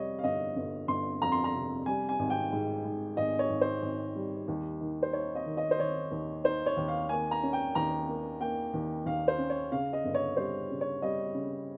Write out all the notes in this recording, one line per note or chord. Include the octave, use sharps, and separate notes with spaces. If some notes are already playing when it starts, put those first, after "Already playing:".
Already playing: F2 C3 G3 C#5 D#5
F5
G1 D#5
G1
G1 C6
F2 A#5
C6
A#5
C3
G3 G#5
G#5
G#1
G5
G#2
G#2
G#1 D#5
C#5
G#1
C5
G#1
G3
D#2
D#3
C5
D#4 C#5
D#5
D#3
D#5
C5
D#3 C#5
D#2
D#4 C5
C#5
D#2
F5
A#3 G#5
A#5
C#4
G5
D#2 A#5
A#3
A#3 G5
D#2
D#2 F5
C5
C#4
C#5
C#3 F5
D#5
G1
C#5
G3 C5
C#3
C#5
G3 D#5
C#3